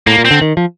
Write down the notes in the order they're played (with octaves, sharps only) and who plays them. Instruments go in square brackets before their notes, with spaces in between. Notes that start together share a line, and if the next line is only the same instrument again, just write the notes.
[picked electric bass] A2 [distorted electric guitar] A#3
[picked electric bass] A#2
[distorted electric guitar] C4
[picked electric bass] D3
D#3
F3